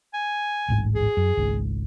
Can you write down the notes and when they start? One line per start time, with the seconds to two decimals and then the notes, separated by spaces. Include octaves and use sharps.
0.14 G#5
0.68 D1 A1 G#2
0.95 G#4
1.17 F#2
1.37 G#1 C#2 G#2